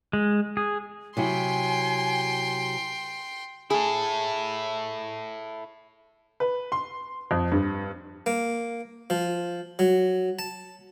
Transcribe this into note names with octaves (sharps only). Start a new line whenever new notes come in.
G#3
G#4
C3 F#3 E4 G5 G#5 C6
E4 G#4 A4
B4
C6
F2
G2
A#3
F3
F#3
A5